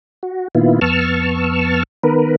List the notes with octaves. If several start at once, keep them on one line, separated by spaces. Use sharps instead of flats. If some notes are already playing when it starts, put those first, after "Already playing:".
F#4
A#2 D#3 B3 E4 F4
F2 B3 A5 C#6 E6 F6
D#3 B3 A#4 B4